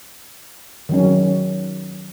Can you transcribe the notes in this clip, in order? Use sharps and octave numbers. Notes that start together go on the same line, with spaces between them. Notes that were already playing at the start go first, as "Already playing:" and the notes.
D#3 F#3 C#4